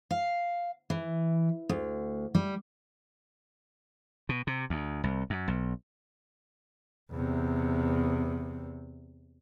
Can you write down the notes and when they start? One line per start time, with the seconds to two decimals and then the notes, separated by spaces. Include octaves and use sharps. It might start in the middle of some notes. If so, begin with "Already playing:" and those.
0.11 F5
0.90 E3
1.69 D2
2.35 G3
4.29 B2
4.47 C3
4.70 D2
5.04 C2
5.30 F#2
5.48 B1
7.12 E2 C3